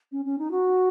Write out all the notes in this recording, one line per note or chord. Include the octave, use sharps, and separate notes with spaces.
C#4
C#4
D#4
F#4